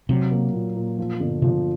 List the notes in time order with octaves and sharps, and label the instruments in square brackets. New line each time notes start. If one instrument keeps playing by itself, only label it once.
[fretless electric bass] C3 [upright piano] F#3
[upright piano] A#3
A#2
A#2
F3
G1
[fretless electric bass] C3 [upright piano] F3